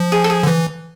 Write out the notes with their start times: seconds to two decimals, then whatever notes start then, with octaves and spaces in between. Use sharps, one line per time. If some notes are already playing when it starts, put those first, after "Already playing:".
Already playing: F3
0.12 G#4
0.24 A4
0.30 G#4
0.43 D3
0.47 E3